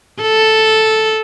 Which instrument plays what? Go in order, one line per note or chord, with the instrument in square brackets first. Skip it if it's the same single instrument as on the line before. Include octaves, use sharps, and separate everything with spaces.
[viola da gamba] A4